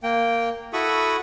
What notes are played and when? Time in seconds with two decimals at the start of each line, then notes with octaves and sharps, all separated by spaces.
0.03 A#3 G5
0.73 E4 F#4 A4 B5 C#6 D#6